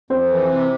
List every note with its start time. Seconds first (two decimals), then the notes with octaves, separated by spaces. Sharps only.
0.10 F2 C4 C5
0.30 E3
0.50 C3